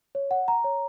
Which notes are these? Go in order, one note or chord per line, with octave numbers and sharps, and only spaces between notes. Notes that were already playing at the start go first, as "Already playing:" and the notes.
C#5
F#5
A#5
C#5